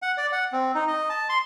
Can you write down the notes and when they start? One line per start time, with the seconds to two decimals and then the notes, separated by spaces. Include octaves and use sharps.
0.02 F#5
0.18 D5
0.32 F#5
0.52 C4
0.75 D#4
0.88 D#5
1.09 A5
1.29 C6